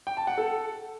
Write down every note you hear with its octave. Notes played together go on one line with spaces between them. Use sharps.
G5
A5
F#5
A4